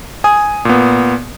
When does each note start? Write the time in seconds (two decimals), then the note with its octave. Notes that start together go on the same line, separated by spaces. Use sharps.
0.24 G#5 D#6
0.65 A#2 B3